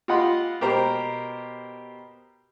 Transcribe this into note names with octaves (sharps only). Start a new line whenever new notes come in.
F4 G4 D#5 F#5 B5 C6
B2 G4 A#4 C5 A#5